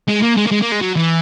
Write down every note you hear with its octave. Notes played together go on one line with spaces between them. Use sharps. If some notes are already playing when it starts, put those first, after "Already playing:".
G#3
A#3
G#3
A#3
G#3
A#3
G#3
F#3
E3